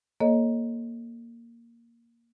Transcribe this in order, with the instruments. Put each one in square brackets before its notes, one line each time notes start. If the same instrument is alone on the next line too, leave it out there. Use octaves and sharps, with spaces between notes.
[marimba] A#3 A4 C#5 D#5